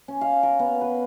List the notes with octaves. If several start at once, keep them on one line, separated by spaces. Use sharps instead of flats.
C#4
F5
A#4
B3
B4